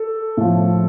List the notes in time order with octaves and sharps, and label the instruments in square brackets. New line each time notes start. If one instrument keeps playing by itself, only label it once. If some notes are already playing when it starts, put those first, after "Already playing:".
Already playing: [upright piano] A4
A2 F3